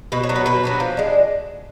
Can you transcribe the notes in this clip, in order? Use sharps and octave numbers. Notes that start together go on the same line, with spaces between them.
B2 B4
C#5
F#3 B3 D4
B4
B2 B4
F#3 B3 D4
F3
G#3 D4